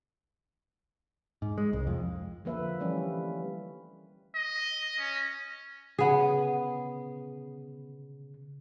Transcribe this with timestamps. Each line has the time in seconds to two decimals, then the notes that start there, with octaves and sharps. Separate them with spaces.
1.42 G#2
1.58 G#3
1.73 C2
1.87 F2
2.45 D3 F3 A#3 B4 E5
2.80 E3 F3 G3 A3 C#4 E4
4.36 D#5
4.99 C#4
5.99 C#3 B3 G#4